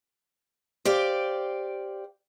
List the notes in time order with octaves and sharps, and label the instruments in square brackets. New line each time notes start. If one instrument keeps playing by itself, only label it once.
[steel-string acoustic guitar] G4 C5 D5 F5 G5